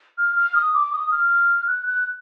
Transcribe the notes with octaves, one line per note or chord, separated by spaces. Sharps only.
F6
F6
D#6
D6
D#6
F6
F#6
F#6